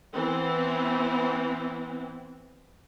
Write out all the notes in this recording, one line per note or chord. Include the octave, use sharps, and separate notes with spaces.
E3 B3 C4